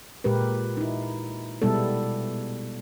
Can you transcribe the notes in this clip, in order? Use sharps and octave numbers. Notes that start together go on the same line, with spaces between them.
A#2 G#3 G4 A#4 B4
D#4 E4
B2 G3 G#3 B3 E4 A4